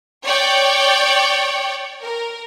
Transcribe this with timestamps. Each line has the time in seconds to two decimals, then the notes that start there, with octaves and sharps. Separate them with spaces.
0.23 C#5 D5 G5
2.02 A#4